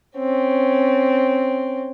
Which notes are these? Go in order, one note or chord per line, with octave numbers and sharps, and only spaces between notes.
C4 C#4